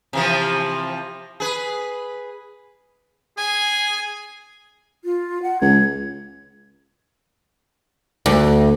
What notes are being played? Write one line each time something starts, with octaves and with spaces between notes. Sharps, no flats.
C3 E3 F3
G#4 B4
G#4 G#5
F4
F#5
C#2 G#6
D2